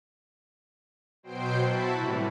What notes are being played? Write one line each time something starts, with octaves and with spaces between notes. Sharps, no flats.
B2 F#3 C5 G5 C7 D7
E4 F#4 A5 B5
A2 C3 E3 G3